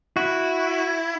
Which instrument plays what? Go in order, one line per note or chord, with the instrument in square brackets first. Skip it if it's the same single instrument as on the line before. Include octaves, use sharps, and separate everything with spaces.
[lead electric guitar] E4 [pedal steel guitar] F#4